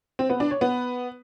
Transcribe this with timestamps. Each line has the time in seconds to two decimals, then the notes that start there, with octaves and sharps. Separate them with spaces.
0.19 C4
0.30 B3
0.40 D4
0.51 C#5
0.61 B3